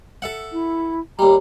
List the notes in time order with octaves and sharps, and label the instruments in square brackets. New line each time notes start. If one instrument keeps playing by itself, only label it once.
[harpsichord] A4 E5 F#5
[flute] E4
[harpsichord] D#2 G3 [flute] A#5